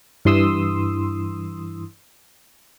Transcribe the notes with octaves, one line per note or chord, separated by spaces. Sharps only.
G2 E3 C6 D#6 E6